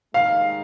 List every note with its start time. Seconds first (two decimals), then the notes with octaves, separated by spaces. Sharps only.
0.14 D#2 D#3 G#3 F5